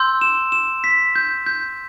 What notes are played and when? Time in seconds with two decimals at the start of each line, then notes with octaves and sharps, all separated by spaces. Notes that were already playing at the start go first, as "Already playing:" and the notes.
Already playing: C6 E6 G6
0.21 E7
0.52 E7
0.84 B6
1.15 G6
1.46 G6